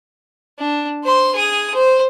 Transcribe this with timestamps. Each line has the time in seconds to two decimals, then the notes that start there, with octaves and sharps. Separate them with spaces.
0.59 D4
1.04 C5 C6
1.35 G#4 D#6
1.74 C5